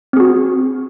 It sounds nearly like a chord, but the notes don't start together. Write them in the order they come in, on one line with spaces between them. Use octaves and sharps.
C4 G#4 F#4